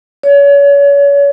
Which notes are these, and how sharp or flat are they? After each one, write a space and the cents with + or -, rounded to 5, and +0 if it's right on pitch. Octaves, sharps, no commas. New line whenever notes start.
C#5 +35